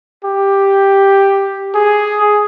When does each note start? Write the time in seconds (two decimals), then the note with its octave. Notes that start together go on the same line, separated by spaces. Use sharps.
0.24 G4
1.74 G#4